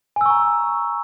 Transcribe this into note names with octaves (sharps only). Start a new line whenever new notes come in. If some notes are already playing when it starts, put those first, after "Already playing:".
G#5 A#5 C#6 E6